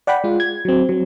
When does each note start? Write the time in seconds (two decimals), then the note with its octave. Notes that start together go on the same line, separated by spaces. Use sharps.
0.07 D5 F#5 G5 B5
0.24 G#3 F4
0.40 G#6
0.65 F#3 C4
0.89 F#3 C4